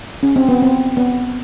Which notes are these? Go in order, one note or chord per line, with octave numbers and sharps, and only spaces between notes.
C#4
C4
B3
C4
B3